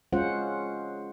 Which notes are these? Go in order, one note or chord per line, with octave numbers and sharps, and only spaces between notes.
G#3 C#4 F4 C5 F#5